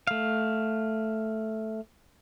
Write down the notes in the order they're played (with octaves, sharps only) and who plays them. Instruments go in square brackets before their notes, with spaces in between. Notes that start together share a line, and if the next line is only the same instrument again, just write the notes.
[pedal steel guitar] A3 F5